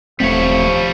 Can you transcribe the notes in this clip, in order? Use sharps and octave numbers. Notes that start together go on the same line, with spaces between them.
D#1 F3 G3 A3 C4 C#5